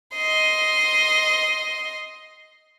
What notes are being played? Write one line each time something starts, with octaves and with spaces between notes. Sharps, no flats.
D#5 C6